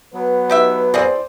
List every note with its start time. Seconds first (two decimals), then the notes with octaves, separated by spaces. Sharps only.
0.14 F#3 B3 B4
0.50 D#4 G4 E5
0.94 C4 E4 G#4 C5 D5